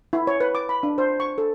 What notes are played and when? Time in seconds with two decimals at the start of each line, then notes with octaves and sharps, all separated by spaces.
0.13 E4
0.27 C#5
0.41 B4
0.55 D6
0.69 B5
0.83 D4
0.98 C5
1.20 C#6
1.38 A4